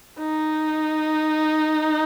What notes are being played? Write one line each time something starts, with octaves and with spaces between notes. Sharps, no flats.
D#4